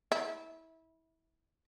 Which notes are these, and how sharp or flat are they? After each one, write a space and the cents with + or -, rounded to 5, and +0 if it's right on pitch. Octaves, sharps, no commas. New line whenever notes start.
E4 -25